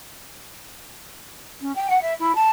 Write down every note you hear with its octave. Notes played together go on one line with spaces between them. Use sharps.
C#4
G5
F#5
E5
E4
A5